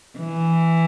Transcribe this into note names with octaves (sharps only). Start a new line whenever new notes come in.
E3